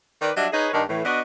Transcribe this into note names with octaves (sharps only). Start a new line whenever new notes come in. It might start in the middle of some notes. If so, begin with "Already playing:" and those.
D#3 B4 D5
F#3 G3 D4 D#5 E5
D#4 G#4 B4 C#5 D#5
G2 D#3 D4 D#4
A2 E3
B3 D4 F#4 D#5